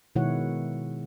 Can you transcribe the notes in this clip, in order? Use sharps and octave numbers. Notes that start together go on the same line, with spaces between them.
B2 D#3 G#3 E4 C#5 F#5